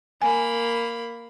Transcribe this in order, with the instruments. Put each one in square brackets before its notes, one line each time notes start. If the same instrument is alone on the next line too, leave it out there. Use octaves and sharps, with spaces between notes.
[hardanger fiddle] A#3 B5 [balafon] G#5